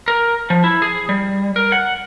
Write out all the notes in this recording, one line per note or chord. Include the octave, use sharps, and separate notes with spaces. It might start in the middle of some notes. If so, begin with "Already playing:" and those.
A#4
F3
E4
G#4
G3
A#4
F#5